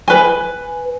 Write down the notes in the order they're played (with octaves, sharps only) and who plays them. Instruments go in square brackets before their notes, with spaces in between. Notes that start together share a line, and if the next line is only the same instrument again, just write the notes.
[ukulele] B4 G#5